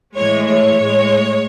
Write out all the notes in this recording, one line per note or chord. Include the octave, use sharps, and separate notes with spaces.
A2 E3 G#3 C#5
C#5
A2
G#3